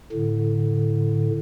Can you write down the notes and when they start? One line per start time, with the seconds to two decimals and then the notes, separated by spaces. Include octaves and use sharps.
0.12 A2 D3